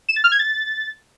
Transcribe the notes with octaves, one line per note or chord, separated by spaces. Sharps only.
E7
A6
F6
G#6
A6